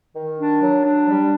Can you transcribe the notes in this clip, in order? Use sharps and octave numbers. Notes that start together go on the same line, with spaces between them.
D#3
D4
F#3
D4
G3